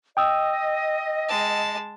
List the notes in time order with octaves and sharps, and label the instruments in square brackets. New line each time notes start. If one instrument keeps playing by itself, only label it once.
[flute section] D#5 [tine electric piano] G5 D#6 E6
[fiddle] G#3 A5